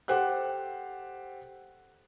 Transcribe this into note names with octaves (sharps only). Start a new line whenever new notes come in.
G4 A4 C5 F#5 F#6